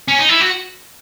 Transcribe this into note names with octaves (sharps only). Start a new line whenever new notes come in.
C#4
D#4
E4
F#4